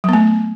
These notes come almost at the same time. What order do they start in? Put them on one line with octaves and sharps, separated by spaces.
F#3 B3 A3